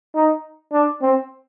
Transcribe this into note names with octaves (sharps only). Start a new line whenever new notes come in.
D#4
D4
C4